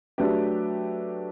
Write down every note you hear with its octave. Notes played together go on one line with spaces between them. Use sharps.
F#3 A3 D4 G4 B4